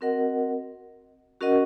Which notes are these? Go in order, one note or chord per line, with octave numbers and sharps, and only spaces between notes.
C4 F#4 A#4 D#5 F#5
C#4 F#4 A#4 D#5 F#5